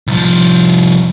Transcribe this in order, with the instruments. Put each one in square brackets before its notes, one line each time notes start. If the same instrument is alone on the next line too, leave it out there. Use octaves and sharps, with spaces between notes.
[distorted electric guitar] C2 F3